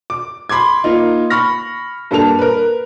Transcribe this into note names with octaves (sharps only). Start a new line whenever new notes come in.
D6
B5 C6 D6 G#6
A#3 D#4 F4
B5 C#6 F6 A#6
G2 A#3 A4 A5 F7
A#4 B4